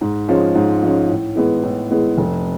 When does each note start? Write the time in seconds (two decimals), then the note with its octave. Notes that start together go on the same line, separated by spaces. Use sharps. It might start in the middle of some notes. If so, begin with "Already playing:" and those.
0.01 G#2
0.28 F3 G#3 C#4
0.55 G#2
0.82 F3 G#3 C#4
1.09 A2
1.36 E3 G#3 B3
1.63 A2
1.90 E3 G#3 B3
2.18 F1